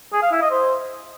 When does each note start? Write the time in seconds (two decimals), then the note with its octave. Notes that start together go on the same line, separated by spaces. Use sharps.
0.13 G#4
0.22 F5
0.32 E4
0.41 D#5
0.51 C5